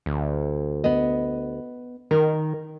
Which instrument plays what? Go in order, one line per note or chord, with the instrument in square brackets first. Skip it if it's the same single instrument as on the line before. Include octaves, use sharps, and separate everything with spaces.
[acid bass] D2
[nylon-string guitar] B3 D#5
[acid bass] D#3 [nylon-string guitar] A#4